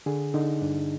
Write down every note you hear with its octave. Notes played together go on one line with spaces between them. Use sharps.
D3 G#4
D3 D#4
G2 D4